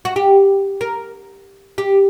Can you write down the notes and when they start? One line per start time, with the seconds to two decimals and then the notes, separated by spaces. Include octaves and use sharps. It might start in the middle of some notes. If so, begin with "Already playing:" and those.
0.05 F#4
0.16 G4
0.81 A#4
1.78 G4